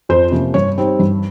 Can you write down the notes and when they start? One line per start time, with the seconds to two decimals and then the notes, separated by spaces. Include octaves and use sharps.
0.09 F2 C5
0.32 C3 F3 A#3 C#4
0.54 G2 C#5
0.78 G3 C4 D#4
0.99 G2